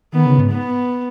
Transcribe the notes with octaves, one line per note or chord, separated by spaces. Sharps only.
D#3 B3
C#3
G#2
B3